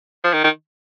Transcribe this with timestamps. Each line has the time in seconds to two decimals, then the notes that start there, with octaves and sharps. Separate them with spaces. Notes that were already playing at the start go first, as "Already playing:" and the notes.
0.24 F3
0.33 D#3
0.44 D#3